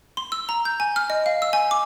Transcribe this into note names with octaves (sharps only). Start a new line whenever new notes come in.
C6
E6
A#5
G6
G#5
F6
D#5
F5
E6
G#5
D6